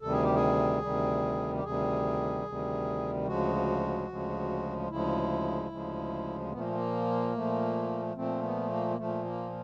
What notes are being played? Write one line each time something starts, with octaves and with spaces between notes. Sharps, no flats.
D2 C3 D#3 G3 A4
G#4
G4
G#4
D2 C3 D#3 G3
G4
D2 C3 D#3 G3 G#4
D2 C3 D#3 G3
D2 C#3 F3 G#3 F#4
D2 C#3 F3 G#3
D2 C#3 F3 G#3 E4
D2 C#3 F3 G#3
A#2 F3 A3 B3
A#3
A3
A#3
A#2 F3 A3
A#2 F3 A3 C4
B3
A#3
A#3
A#2 F3 A3
A#3